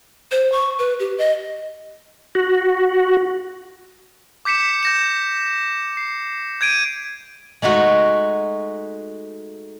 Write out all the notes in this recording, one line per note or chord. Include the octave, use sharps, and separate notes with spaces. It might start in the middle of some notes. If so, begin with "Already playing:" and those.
C5
C#6
B4
G4
D#5
F#4
D6 G6 B6 C#7 E7
G6 A#6 E7
C7
G6 G#6 D7 D#7
G#3 A3 D#4 F#4